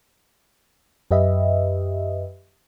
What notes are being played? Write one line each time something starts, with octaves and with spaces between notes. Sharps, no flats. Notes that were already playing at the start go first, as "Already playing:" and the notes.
F#2 G4 B4 D#5 E5